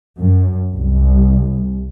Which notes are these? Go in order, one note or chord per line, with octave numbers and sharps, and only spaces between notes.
F#2
C2